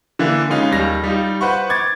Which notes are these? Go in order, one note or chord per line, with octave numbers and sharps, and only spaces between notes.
D3 E3 A#3
C#3 G#3 C#4 D#4 F4
D#2 G3 A#6
G3 D#4 F4
B4 C5 F#5 B5 C#6
D6 G#6 A6